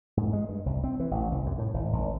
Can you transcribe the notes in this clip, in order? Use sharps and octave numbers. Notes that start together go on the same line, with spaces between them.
G#2
G#3
G2
C2
C4
E3
A1
C2
F#2
A2
G#1
G#1